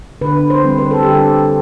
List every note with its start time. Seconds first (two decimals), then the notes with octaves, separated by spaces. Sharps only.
0.21 D3 B4
0.50 C5
0.64 G3 C4
0.78 B4
0.91 A4
1.03 D3 G4
1.15 A4